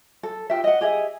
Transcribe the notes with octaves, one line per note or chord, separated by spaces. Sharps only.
A4
F4 G4 E5
D#5 F#5
G4 G#4 D#5 E5